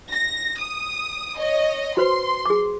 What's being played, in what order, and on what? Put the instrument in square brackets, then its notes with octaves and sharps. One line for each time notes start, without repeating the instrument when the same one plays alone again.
[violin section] A#6
D#6
C#5 D#5
[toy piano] F#4 B4 C5 [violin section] C6
[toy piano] G#4 D6